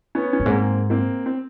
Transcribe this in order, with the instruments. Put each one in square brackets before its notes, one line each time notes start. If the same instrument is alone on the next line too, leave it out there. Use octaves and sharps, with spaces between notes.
[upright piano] B3 C#4
C#4
[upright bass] G2
[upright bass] G#2 [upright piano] A#3 C4
[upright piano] A#3 C4
C4